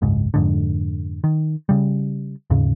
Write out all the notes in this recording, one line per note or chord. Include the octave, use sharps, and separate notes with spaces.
F#1 C#2 G#2
F2 G#2 D3
D#3
C#3 G3
D#2 G#2 C#3